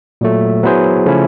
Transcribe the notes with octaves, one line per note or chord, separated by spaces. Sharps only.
A#2 F#3 A3
F#3 B3 E4 G#4 C5
C#3 F3 A3 C#4 E4